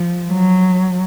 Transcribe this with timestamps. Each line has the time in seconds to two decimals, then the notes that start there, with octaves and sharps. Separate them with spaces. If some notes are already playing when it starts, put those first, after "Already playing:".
Already playing: F3
0.32 F#3